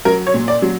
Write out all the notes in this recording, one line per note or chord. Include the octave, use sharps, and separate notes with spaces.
F#3 A#4
C#5
A#2
D5
F#3